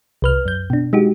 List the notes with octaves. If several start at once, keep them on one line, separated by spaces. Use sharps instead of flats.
C2 B4 F6
F#2 G6
B2 D4
G#3 D#4 F#4 G4